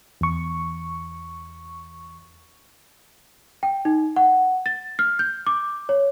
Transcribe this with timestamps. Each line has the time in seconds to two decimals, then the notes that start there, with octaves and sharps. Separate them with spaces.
0.21 E2 C#6
3.63 G5
3.85 D#4
4.16 F#5
4.66 A6
4.99 F6
5.19 G6
5.47 D6
5.89 C#5